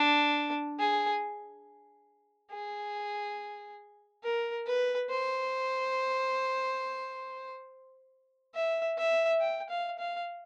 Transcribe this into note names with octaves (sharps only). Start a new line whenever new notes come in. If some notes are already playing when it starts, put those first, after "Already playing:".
Already playing: D4
G#4
G#4
A#4
B4
C5
E5
E5
G5
F5
F5